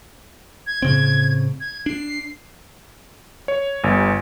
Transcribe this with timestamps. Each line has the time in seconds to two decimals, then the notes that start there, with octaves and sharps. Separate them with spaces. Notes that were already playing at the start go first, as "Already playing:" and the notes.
0.66 G#6
0.82 A2 C#3 C4
1.60 G#6
1.86 D4 C7
3.48 C#5
3.84 G1